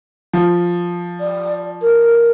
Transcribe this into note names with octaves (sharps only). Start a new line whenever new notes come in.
F3
D5
A#4